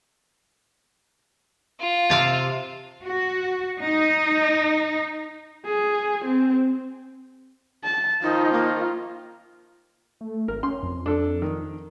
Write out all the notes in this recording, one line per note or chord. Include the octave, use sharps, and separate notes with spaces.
F4
C3 F5 A5
F#4
D#4
G#4
C4
A5
D#3 F3 D#4 F4
A#3
A3
G#1 A#4
C#4 C6
F2
D4 A4
D#3